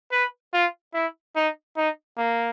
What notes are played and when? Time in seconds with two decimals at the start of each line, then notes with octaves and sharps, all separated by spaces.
0.12 B4
0.53 F4
0.94 E4
1.36 D#4
1.77 D#4
2.17 A#3